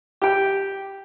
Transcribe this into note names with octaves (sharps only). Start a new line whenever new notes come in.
G4 G5